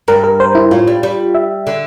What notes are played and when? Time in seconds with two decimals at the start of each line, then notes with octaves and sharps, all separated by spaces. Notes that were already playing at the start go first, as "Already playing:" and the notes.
0.08 G2 A#4
0.24 A#4
0.40 C5
0.55 E4
0.71 A2 F4
0.87 G3
1.03 G3
1.35 E5
1.67 D3